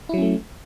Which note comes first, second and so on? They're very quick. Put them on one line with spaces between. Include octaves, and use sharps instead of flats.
E4 F#3 C#4 A3